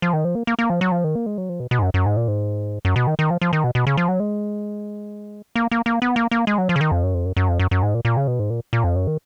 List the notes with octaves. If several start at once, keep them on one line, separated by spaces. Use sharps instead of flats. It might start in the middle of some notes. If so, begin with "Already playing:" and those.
F3
D#3
F3
A#3
A#3
A#3
F3
F#3
F3
D#3
A#3
G#3
F#3
F3
B2
B2
G#2
F#2
F#2
G#2
A#2
G#2
F#2
B2
D#3
D#3
F3
F3
D#3
B2
B2
C#3
F3
F#3
G#3
A#3
A#3
A#3
B3
A#3
A#3
G#3
F#3
F3
C#3
D#3
F2
F#2
F2
F#2
F#2
F2
F#2
F#2
G#2
A#2
A#2
C#3
B2
G#2
A#2
A#2
F2
F#2
D#3